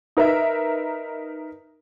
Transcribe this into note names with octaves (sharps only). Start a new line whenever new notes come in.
D#4 A#4 B4 E5